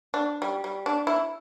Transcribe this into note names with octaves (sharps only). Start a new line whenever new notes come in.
D4
G3
G3
D4
E4